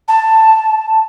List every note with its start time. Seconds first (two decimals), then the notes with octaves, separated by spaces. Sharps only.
0.08 A5